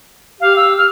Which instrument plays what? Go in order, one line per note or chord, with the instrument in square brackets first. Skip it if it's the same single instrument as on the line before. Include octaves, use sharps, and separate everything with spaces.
[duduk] G4 [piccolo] F5
[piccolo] E6
F6